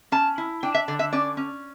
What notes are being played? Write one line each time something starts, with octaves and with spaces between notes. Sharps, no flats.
C#4 A5
E4
D4 G5
E5
D3 D5
E5
C#4 D5
C#4